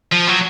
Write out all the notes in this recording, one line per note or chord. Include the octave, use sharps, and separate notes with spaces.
F3
F#3